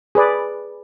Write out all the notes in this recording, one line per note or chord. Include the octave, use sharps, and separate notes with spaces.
G#4 B4 D5